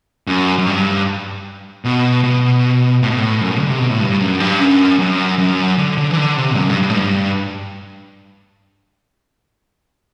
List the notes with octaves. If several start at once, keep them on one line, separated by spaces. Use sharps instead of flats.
F#2
F#2
G2
B2
B2
A2
B2
A2
F#2
D3
C3
B2
A2
G2
F#2
G2
F#2
F#2
F#2
D3
D3
E3
D3
C3
F#2
G2
G2
A2
G2